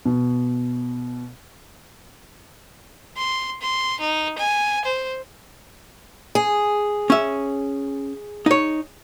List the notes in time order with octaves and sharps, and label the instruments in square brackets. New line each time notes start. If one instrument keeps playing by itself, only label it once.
[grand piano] B2
[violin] C6
C6
D#4
G#5
C5
[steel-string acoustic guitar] G#4
[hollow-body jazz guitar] C#4 E5
D#4 C#5